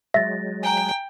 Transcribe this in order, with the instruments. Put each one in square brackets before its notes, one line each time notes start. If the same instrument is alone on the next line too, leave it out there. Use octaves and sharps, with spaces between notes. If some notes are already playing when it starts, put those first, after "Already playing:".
[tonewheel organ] F#3 G#3 [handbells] E5 [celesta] A6 A#6
[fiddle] G5 [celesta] G#5 A#5